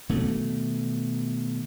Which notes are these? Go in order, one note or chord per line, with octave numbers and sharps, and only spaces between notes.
B2 D#3 A3